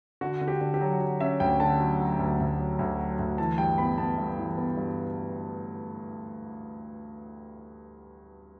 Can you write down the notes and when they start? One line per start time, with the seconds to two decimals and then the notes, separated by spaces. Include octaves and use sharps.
0.21 D3 F#4
0.41 D3
0.48 G4
0.61 D3
0.74 G4
0.81 F#3
1.01 F#3
1.20 C#4 E5
1.40 D2 G5
1.60 D3 A5
1.80 F#3
2.00 F#3
2.19 D2
2.40 D2
2.59 F#3
2.79 D2
2.99 F#3
3.19 D2
3.38 E3 A5
3.58 G2 G5
3.78 B3 B5
3.98 B3 A5
4.18 G2
4.38 E3
4.57 B3
4.77 G2